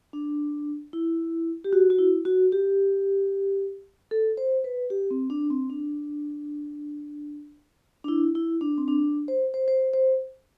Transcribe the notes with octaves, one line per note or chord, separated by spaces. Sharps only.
D4
E4
G4
F#4
F#4
E4
F#4
G4
A4
C5
B4
G4
C4
D4
C4
D4
D4
E4
E4
D4
C4
D4
C5
C5
C5
C5